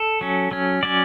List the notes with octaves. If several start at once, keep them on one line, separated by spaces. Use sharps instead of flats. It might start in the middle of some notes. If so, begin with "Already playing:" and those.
Already playing: A4
F#3 C#4
F#3 C#4
F#3 C#4 D5